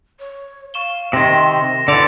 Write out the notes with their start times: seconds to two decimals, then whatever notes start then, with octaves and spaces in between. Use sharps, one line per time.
0.20 C#5
0.74 F5 C#6 E7 G7
1.13 C3 D#3 C6 A#6
1.88 D3 E3 D5 C6 A6 C#7 F7